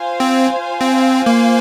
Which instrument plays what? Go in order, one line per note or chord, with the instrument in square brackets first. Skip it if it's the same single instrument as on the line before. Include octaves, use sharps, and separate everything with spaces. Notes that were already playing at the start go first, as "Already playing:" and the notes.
Already playing: [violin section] F4 C5 F5 G#5
[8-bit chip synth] C4
C4
A#3